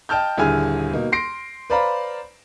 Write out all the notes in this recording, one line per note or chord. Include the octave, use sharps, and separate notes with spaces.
D#5 G5 A5 F6 G6
D#1 D3 E4 G#4 G#5 F6
B2 A#3 D#4
C6 A#6 C7 D7
B4 C5 D5 F5 A#5 B5